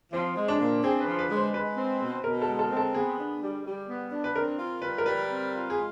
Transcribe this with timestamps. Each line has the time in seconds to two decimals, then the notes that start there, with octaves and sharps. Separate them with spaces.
0.12 F3 C4
0.36 G#3
0.48 D4
0.60 A#2
0.83 C4 G#4
1.00 B4
1.06 F3
1.19 B4
1.30 G#3
1.36 C5
1.53 G#3 B4
1.77 C4
2.00 B2
2.24 B2 A#4
2.42 A4
2.48 G#3
2.59 A4
2.71 C4
2.77 A4
2.94 B3 G#4
3.18 D4
3.41 G3
3.65 G3
3.88 B3
4.12 D4
4.24 B4
4.35 C4 A#4
4.59 F4
4.82 G3 B4
4.98 A#4
5.05 G3 B4
5.29 C4
5.53 F4
5.70 G#4
5.76 G#3